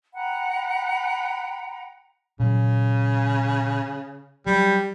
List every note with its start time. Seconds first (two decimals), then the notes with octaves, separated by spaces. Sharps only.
0.14 F#5 G5 A#5 B5
2.40 A#2 C#3 F#3
4.46 F#3 G3